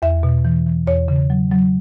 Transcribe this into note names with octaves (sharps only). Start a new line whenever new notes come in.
E2 E5
B2
E3
E3
E2 C#5
C#3
F#3
F#3